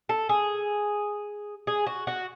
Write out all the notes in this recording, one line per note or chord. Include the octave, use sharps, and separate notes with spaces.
A4
G#4
G#4
F#4
F#4